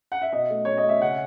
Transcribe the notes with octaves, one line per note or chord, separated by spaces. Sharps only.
F#5
E5
B2 D#5
A3
B2 C#5
D#5
A3
E5
C#3 F#5